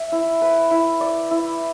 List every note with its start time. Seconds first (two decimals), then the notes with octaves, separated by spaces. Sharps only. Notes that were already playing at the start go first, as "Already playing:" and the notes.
Already playing: E5
0.12 E4
0.42 B4
0.71 E4
1.01 D5
1.31 E4